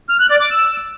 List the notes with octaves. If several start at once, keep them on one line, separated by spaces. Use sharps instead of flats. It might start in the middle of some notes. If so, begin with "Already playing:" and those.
F6
F#6
D5
D6
E6